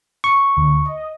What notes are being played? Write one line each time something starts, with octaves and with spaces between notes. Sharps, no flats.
C#6
D2 D3
D#5